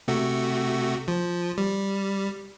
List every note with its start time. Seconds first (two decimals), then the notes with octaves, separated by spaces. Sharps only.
0.08 C3 A3 F#4
1.08 F3
1.58 G3